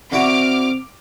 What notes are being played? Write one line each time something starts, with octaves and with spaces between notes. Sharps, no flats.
D3 C4 E4 F#4 D6 F6